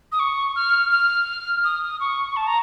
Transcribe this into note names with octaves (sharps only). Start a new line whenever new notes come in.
D#6
C#6
F6
F6
D#6
C#6
A5
A#5